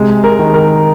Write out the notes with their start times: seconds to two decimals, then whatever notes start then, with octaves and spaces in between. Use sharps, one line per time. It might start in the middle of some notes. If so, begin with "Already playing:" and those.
Already playing: C3 G#3
0.24 A#4
0.39 D#3
0.54 A#4